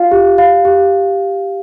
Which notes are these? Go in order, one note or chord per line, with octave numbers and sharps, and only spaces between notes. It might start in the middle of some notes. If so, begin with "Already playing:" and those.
Already playing: F4 F5
G4
F5
G4